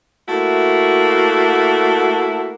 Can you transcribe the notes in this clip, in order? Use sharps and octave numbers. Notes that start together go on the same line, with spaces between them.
A3 A#3 E4 F#4